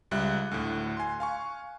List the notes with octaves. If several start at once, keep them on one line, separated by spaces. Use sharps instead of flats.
C#2 G3 E5 F#6
D2 A2
G#5 C6
F5 G#5 C#6